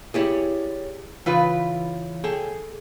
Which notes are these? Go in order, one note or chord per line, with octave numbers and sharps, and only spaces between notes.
E4 G4 G#4 C#5 D5
C#3 E3 F4 B4
G#4 A4 G5